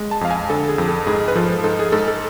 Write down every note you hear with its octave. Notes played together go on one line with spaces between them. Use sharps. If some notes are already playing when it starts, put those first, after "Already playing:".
Already playing: G#3
A5
F2 F5
G#5
D3 A4
G#4
F2
A4
G#2 G#4
B4
F3 A4
G#2 A4
G#4
G#2 A4
A4